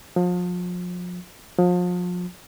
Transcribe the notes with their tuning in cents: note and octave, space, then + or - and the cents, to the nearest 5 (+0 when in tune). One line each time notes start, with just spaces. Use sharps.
F3 +35
F3 +35